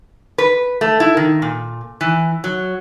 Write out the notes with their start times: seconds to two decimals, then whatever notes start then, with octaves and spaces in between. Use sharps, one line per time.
0.38 B4
0.81 A3
1.00 E4
1.17 D#3
1.42 A#2
2.01 E3
2.44 F#3